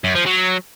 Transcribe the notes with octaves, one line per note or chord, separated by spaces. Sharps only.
F#2
F3
F#3